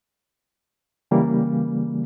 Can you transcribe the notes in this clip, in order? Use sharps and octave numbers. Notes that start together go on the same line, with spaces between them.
C#3 E3 G3 A#3